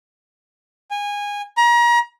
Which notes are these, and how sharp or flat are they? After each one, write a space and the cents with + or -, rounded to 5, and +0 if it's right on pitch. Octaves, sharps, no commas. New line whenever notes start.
G#5 -20
A#5 +35